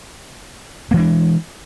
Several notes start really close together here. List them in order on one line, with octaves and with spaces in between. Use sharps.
A#3 E3 G#3 D4